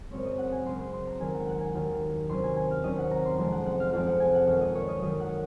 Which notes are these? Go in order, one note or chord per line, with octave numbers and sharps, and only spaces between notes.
F#2 C#3 G#3 C4 C#5
D#5
F#5
G#5
F#2 C#3 G#3 C4 C6
C6
C6
A#5
D#2 D#3 F#3 G#5
F#5
F#5
G#5
D#2 D#3 F#3
C3 D#3 F#3 C#4 C6
G#5
G#5
F5
C3 D#3 F#3 C#4 D#5
F#5
A#5
C6
F2 C3 F3 G#3 C4 C6
F#5
F#5
F5
F2 C3 F3 G#3 C4 F5
F#5
G#5
F#5
F#2 D#3 F#3 F5
D#5
C#5
D#5
F#2 D#3 F#3 D#5
F#5